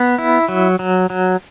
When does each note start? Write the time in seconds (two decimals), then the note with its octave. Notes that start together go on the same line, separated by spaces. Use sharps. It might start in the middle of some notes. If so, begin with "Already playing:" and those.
Already playing: B3
0.18 E4
0.49 F#3
0.79 F#3
1.10 F#3